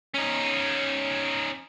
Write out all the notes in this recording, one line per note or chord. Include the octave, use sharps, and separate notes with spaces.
C#4 D#4